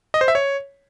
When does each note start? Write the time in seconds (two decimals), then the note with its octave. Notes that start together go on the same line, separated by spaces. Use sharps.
0.14 D#5
0.21 C5
0.28 E5
0.35 C#5